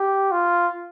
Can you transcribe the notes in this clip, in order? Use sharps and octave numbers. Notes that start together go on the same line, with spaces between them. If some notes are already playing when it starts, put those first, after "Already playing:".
Already playing: G4
F4